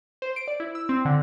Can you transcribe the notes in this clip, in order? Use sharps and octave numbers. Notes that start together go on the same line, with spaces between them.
C5
D7
D5
E4
E6
C4
D3